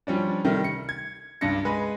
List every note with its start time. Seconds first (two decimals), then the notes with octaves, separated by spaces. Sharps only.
0.07 F3 G3 C#4 D4
0.44 C3 D#3 G3 A3
0.64 C#7
0.89 G#6
1.41 C#2 G2 D4 A#6 C#7
1.65 G#3 B4 G#5